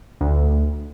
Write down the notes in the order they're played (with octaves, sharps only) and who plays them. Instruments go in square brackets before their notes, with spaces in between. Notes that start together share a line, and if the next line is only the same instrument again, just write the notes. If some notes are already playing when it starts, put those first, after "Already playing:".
[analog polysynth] D2